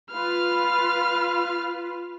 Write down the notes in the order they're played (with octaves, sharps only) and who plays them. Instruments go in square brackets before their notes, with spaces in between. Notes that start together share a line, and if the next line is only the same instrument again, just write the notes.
[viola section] F4 B4 [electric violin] F5 F6